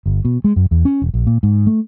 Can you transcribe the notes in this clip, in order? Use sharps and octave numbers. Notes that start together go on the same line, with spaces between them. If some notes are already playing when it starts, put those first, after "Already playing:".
G1
B2
G#3
F#2
E2
C#4
E1
A#1
A#2
G#2
A3